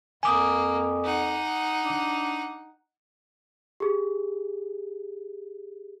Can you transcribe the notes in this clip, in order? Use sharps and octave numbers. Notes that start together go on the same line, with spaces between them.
F2 A#3 G#5 D6 D#6
D#4 F#5
D4
G4 G#4